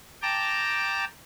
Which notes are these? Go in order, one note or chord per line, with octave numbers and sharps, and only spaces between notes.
G5 A5 A#5 D6